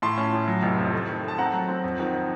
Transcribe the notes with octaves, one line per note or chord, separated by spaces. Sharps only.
A2 A5 C6
C#4
A2
F#3
F1
F2
A3
D#3
A3
A5
C4 F#5 A#5
F#3
C4
F2
D#3